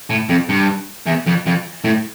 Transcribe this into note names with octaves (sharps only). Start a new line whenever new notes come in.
A2
F2
G2
E2
F2
F2
A2